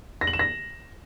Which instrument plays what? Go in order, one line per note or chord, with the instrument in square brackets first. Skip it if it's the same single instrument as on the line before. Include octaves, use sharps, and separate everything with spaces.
[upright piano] A#6
F#7
E7
A#6